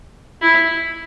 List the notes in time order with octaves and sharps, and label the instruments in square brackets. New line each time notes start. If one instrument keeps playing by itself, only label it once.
[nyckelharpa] E4